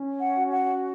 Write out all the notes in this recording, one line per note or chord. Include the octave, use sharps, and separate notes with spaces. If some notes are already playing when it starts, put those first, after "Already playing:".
Already playing: C#4
F#5
F#4
F#5